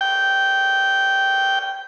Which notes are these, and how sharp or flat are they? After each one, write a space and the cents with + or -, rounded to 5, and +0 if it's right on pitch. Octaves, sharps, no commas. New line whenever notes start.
G5 -10